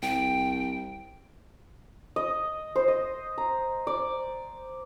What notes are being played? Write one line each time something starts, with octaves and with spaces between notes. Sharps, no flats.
C2 G5
D#5
C5
D#5
A#5
D5